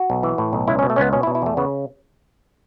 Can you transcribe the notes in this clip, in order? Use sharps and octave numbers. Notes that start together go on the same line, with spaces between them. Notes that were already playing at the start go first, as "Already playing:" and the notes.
Already playing: F#4
B1
E3
A2
B1
C#2 E4
C#4
B2
A3
C#2 B3 C#4
B2 C#4
E4
B2
E4
E2 A3
C#3 B3